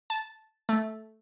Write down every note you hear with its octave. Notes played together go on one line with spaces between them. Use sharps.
A5
A3